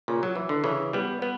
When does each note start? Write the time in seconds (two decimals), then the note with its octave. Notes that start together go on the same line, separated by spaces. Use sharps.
0.08 A#2 C#3
0.23 F#3
0.35 E3
0.49 D3
0.64 C#3 E3
0.93 G3 B3
1.22 B3